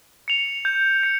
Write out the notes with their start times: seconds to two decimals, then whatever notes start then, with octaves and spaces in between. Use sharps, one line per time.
0.28 C#7 F7
0.65 G6
1.03 C#7